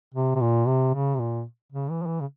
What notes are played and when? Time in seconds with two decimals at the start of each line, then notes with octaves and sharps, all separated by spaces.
0.14 C3
0.35 C3
0.41 A#2
0.67 C3
0.94 C#3
1.15 C3
1.19 A#2
1.72 C#3
1.90 E3
2.02 F3
2.07 E3
2.20 C#3